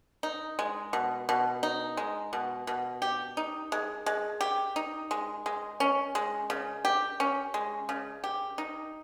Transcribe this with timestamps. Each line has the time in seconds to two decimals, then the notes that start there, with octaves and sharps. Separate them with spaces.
0.23 D#4
0.59 G#3
0.93 B2
1.29 B2
1.63 D#4
1.97 G#3
2.33 B2
2.67 B2
3.02 G4
3.37 D#4
3.72 G#3
4.06 G#3
4.41 G4
4.76 D#4
5.11 G#3
5.46 G#3
5.80 C#4
6.15 G#3
6.50 C#3
6.85 G4
7.20 C#4
7.54 G#3
7.89 C#3
8.24 G4
8.58 D#4